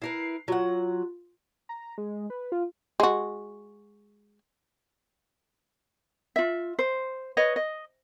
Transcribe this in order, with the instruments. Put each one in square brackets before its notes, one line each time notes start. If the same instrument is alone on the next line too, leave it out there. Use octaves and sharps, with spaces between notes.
[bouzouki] E4 A#4 B4 [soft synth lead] C7
[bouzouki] F#3 F#5 [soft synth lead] F4
[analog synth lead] A#5
G#3
B4
F4
[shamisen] G#3 F#4
[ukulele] F4 E5
C5
B4 C#5 D#5
D#5